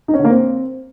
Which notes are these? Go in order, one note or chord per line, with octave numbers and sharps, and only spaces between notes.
D#4
C#4
D3
A#3
C4